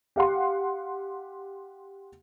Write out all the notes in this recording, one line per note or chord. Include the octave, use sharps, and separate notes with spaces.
G4 F5 F#5 C6